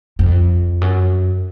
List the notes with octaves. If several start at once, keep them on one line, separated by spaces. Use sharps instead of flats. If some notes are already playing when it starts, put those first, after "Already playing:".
F2
F#2